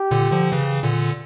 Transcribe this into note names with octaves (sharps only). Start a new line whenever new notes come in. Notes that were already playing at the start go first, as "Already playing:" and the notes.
Already playing: G4
A#2 D3
D3 F3
C#3 E3
A#2 D3